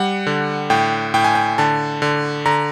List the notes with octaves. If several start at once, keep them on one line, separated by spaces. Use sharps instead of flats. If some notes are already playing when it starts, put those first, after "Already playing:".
Already playing: G3 F#5
D3
A2 G5
A2 G5
G#5
G5
D3 A5
D3
D3 A#5